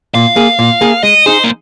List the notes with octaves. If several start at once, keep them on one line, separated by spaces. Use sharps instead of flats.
A#2 F5
A#3 G#4
A#2
A#3 G#4
G#3 D#5
D#4 G#4 C5
A#3